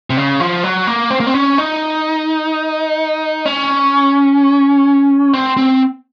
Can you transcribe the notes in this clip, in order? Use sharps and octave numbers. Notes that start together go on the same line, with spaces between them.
C3
C#3
F3
F#3
A#3
C4
A#3
C4
C#4
D#4
C#4
C4
C4